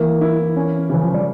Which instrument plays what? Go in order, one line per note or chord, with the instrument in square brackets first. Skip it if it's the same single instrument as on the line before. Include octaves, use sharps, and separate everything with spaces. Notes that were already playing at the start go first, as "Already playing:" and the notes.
Already playing: [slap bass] E3 [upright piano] A#3
[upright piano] E4
C#4
[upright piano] C#3 [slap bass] E3
[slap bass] F3
G3